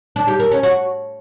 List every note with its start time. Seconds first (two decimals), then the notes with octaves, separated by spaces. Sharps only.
0.16 D4
0.28 G4
0.40 A#4
0.51 C#4
0.63 F#4